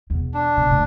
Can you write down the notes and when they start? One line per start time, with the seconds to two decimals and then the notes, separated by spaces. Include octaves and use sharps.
0.10 E2 B2
0.34 D4
0.57 B2
0.68 C#2 A2